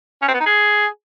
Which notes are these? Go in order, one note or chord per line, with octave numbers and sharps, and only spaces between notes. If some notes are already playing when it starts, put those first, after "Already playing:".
C#4
C4
B3
D#4
G#4